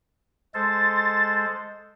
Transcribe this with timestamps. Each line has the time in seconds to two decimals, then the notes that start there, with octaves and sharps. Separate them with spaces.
0.54 G#3 A4 C5 A6